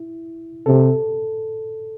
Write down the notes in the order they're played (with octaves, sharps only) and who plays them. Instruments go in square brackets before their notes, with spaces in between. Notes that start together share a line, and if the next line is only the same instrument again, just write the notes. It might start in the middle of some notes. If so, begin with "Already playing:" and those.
Already playing: [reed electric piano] E4
[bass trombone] C3 [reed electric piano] A4